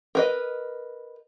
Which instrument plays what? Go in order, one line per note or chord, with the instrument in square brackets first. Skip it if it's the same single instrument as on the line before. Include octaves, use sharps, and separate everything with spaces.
[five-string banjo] A#4 B4 D#5